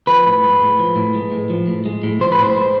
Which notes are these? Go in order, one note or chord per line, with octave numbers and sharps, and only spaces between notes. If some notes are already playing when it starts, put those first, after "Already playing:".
F3 B4
A2
G#3
A2
F3
A2
G#3
A2
F3
A2
G#3
A2
F3 C5
B4
A2
C5
G#3